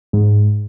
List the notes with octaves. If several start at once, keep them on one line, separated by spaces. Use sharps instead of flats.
G#2